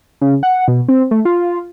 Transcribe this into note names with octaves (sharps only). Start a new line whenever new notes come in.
C#3
F#5
B2
C4
A3
F4